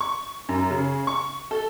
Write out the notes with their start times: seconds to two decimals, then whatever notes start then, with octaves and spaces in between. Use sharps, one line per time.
0.01 C#6
0.49 F#2
0.70 C#3
1.07 C#6
1.51 A4